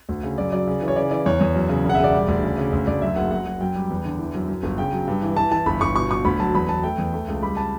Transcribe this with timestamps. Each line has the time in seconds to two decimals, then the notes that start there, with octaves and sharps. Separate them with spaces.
0.09 D2
0.23 C#3
0.38 F#2 D5
0.52 F#3 D5
0.67 C#3
0.82 E3
0.88 C#5
0.96 C#3 D5
1.11 E3 D5
1.26 E2 C#5
1.41 E2
1.55 F#2
1.69 C#3
1.84 E1
1.90 F#5
1.94 E5
2.00 E1 D5
2.14 G3
2.28 D2
2.43 C#3
2.58 C#3
2.73 D2
2.87 D2 D5
3.02 F#2 E5
3.16 F#1 F#5
3.31 F#3 F#5
3.46 F#3
3.60 F#2 G5
3.75 G3
3.90 E2
4.05 D3
4.19 E3
4.35 F#2
4.48 F#2
4.63 G1
4.78 C#3 G5
4.93 F#3
5.07 G2
5.23 E3
5.37 E3 A5
5.52 E3 A5
5.66 G1 B5
5.81 G1 C#6
5.96 B2 C#6
6.11 B2 C#6
6.25 D2 B5
6.39 F#3 A5
6.54 E2 B5
6.69 E2 A5
6.83 A3 G5
6.98 E2
7.13 A3
7.28 C#2
7.42 G3 B5
7.57 A5